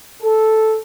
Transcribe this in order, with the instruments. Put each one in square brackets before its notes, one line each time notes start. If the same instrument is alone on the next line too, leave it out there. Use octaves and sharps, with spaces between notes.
[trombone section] A4